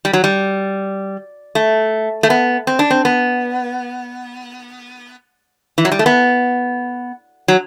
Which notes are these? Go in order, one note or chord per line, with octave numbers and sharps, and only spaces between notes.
G3
F#3
G3
A3
A3
B3
C4
D4
C4
B3
E3
F#3
G3
A3
B3
F#3